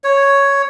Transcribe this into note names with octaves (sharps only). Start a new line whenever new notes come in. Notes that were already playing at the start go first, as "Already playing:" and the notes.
C#5